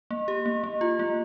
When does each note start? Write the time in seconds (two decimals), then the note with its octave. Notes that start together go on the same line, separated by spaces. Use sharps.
0.11 A#3
0.28 G4
0.46 A#3
0.64 A#3
0.81 F4
0.99 A#3